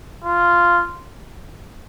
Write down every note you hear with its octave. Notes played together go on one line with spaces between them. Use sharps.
F4